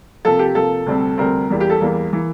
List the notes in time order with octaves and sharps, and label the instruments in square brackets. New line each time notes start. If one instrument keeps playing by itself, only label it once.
[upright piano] C3 F3 A#3 A4
G4
C3 F3 A#3 A4
D2 C3 G3 C4
D2 C3 G3 C4 A#4
E2 E3 G3 A#3
G4
A4
E2 E3 G3 A#3
E3 A#3